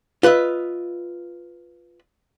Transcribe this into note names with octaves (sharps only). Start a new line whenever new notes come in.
F4 B4 D#5 E5